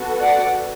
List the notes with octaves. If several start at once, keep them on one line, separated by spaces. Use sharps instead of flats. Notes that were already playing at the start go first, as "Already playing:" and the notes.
Already playing: B3 F#4 A4
D5 F#5